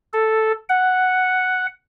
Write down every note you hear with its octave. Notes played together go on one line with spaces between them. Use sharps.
A4
F#5